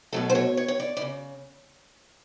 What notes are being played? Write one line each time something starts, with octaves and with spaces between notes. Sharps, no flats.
B2 F#3 A3 A4
C5
C#5
C#5
C#5
D5
D5
C#3